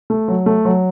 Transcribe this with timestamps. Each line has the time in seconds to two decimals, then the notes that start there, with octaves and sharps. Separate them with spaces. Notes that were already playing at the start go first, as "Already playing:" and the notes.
0.10 A3
0.28 F#3
0.46 A3
0.65 F#3